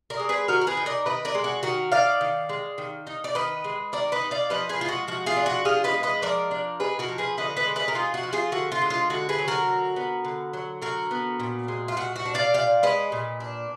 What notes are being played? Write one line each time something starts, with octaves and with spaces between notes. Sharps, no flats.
A#4 D5
G#3
G#4 B4
D#3 F#4 A#4
A#4
G#4 B4
D#4
A#4 D5
D#3 B4 D#5
A#4 D5
G#3
F#4
D#3 F#4 A#4
D#4 D5 F5
D#3
G#3
D#3
D#4
D5
D#3 B4 D#5
G#3
D#3 A#4 D5
B4 D#5
D#4
D5 F5
F3 B4 D#5
G#4 B4
G#3 F4
F#4
F3 F#4
F4 G#4
D4
F#4
F3 F4 G#4
B4 D#5
G#3
B4 D#5
F3 A#4 D5
D4
D#4 G#4 B4
F#4 A#4
F3
G#4 B4
D3 B4 D#5
B4 D#5
G#3
B4 D#5
A#4
D#4 F4 G#4
F#4
F3
F4 G#4
D3 F#4
F4
G#3
F4
D3 F#4
G#4 B4
F#3
F#4 A#4
D3
B3
D3
F#3
D3 F#4 A#4
B3
A#2
G#3
F4
A#2 F#4
F#4
D4
D5 F5
A#2 D5 F5
G#3 B4 D#5
A#2
D4